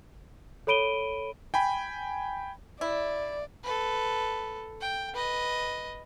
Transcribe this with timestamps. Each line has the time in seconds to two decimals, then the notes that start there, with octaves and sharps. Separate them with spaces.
0.67 A4 C#5 B5 D7 D#7 G7
1.54 G5 G#5 B5
2.81 E4 D5
3.64 A4 B4
4.81 G5
5.14 B4 D#5